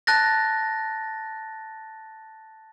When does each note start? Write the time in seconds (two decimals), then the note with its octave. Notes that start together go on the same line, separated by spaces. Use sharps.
0.07 A5 F#6 A6 A#6